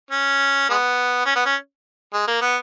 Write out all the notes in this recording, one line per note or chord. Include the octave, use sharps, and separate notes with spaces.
C#4
G#3 B3
C#4
B3
C#4
G#3
A#3
B3